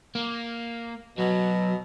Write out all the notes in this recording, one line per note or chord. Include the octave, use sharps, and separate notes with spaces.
A#3
B2 F#3